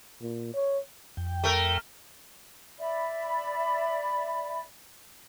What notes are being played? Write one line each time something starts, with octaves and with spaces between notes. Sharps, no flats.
A#2
C#5
F2 G5
A3 A#4
D5 E5 B5